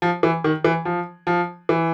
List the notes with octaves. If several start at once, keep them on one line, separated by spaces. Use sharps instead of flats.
F3
E3
D#3
E3
F3
F3
E3